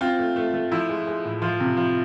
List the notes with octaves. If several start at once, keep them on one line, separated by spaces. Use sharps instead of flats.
C4 F4
A3
A3
A3
F3 E4
G#3
G#3
A2
F3 F4
C3
F3